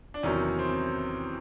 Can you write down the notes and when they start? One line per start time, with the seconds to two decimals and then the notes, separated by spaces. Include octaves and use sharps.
0.14 D4
0.23 E2 C3 D#3 F#3 C#4
0.59 C4